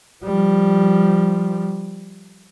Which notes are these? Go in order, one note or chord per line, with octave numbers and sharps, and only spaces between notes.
F3 G3